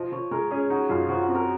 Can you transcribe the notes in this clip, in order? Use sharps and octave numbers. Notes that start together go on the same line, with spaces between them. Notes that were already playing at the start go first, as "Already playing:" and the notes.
Already playing: F3 D#5
F3 C#5
G#3 A#4
C#4 G#4
D#4 F#4
F#2 F4
F3 F#4
F#4
C4
A#4